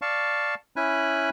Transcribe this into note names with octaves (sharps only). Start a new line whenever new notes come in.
D5 F5 A5 C#6
C#4 E4 G#5 B5 F#6